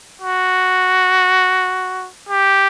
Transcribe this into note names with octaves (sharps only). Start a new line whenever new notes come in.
F#4
G4